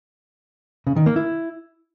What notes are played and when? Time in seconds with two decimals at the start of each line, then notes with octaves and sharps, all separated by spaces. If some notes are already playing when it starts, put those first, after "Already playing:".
0.87 C#3
0.96 D#3
1.06 A#3
1.16 E4